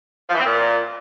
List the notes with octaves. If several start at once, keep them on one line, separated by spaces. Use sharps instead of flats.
F3
E3
C4
A#2